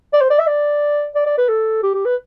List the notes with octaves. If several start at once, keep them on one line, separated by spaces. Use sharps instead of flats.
D5
C5
D5
E5
D5
D5
D5
B4
A4
G4
G4
B4